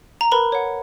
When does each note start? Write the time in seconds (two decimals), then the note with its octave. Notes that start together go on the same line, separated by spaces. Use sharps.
0.21 A#5
0.32 A#4 B4 B5
0.52 C#5 F#5